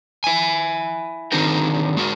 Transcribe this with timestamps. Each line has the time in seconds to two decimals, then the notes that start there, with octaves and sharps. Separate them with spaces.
0.24 E4 G#5
1.32 D3 D#3 C4 D#4 A#4 G5
1.97 G#3 F#4 A#4